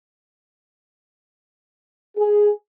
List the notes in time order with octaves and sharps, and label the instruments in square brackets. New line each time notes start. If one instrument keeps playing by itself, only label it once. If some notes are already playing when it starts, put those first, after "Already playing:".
[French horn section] G#4